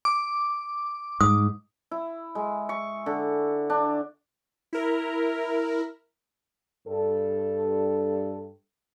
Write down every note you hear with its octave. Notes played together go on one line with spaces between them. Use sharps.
D6
G#2 D#6
E4
G#3
C#6
D3
D4
E4 A#4
G2 A4